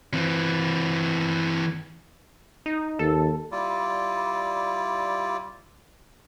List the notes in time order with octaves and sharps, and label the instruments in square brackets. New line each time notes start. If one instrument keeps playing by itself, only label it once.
[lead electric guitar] E3 C4
[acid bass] D#4
[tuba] D#2 [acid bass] A4
[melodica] G3 E4 F4 D5